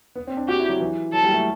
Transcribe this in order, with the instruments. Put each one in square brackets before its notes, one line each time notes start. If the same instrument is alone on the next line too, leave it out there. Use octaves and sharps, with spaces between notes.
[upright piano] B3
C4
D4
[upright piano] F#4 [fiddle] G4
[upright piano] E4
F#3
E3
[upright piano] F#3 [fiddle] A4
[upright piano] G3
A3